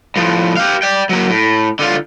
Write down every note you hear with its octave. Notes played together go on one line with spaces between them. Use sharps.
A2 F3
G4 F5
D5 G5
F#3 A#3
A2
D3 F4